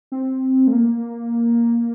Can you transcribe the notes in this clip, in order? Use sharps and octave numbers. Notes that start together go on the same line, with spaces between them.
C4
A3
A#3